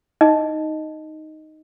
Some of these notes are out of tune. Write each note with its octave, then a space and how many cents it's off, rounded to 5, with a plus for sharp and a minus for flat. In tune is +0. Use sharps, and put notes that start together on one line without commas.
D#4 +0 D#5 +0